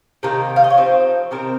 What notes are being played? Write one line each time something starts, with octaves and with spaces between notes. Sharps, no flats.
C3 D#3 A#3 A#5
F5
D#5
C#5
F3 C4 D#4 C5
C3 D#3 C4 A#4